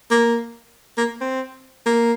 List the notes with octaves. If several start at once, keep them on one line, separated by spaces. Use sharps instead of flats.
A#3
A#3
C4
A#3